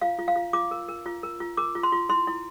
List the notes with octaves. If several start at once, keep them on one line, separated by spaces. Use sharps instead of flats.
F4 F5
F4
F5
F4
F4 D6
A#4
A#4
F4
A#4
F4
A#4 D6
F4
C6
F4
E4 C6
E4